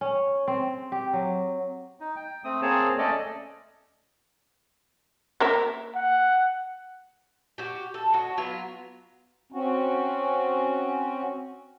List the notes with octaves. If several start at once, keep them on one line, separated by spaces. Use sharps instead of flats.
C#4
C4
G4
F#3
D#4
G5
A3 C4 D#6
A#3 C4 G#4 C#5 A5
A3 C#4 A4 D5 D#5
A#3 A#4 E5
F#5
F#4 G4
A4
F#4 C#5 D#5
F#3 B3 F4
C4 C#4 F#4